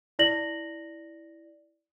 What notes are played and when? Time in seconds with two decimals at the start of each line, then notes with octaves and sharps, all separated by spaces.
0.19 E4 D5 A#6 F#7